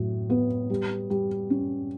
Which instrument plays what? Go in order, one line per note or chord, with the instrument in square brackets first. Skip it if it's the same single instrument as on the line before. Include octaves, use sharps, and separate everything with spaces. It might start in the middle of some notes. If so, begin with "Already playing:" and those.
Already playing: [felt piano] A2 F#3
B3
G3
G3
C#4